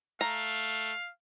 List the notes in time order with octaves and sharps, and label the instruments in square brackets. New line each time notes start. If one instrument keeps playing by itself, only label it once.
[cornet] A3 [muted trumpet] F5 [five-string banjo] A#5